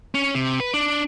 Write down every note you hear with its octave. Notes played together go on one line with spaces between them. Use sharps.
C#4
C3
B4
D4